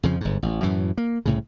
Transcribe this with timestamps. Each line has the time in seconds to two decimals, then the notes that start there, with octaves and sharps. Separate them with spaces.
0.03 F2 C#3 F3
0.21 G1 G#2
0.43 A1
0.63 F#2 A2 E3
0.97 A#3
1.25 C2 A2 C#3